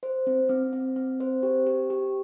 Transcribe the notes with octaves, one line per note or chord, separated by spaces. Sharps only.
C5
C4
C4
C4
C4
C5
G4
G4
G4